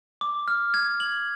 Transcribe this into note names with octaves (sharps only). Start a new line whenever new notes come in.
D6
F6
G#6
F#7